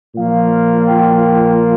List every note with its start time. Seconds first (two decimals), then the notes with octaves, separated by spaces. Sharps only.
0.16 A#2 F3 A#3 F4 F5
0.86 G5
1.21 G5